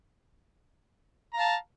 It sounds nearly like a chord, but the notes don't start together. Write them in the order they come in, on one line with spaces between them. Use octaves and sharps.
A#5 F5 A5